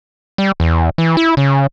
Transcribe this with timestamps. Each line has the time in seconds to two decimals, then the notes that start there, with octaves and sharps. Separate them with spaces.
0.38 G3
0.60 E2
0.98 E3
1.17 E4
1.37 C#3